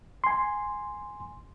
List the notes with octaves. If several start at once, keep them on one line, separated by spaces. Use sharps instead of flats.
G#5 C6